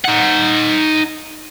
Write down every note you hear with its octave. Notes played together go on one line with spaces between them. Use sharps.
D#4 F#5